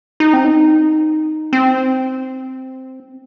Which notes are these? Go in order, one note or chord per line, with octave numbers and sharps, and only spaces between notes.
D#4
C4
D#4
C4